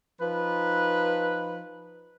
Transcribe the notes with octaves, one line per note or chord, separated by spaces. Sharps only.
F3 D#4 B4